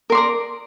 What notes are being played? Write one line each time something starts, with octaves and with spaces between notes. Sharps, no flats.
A#4 D5 A#5 C6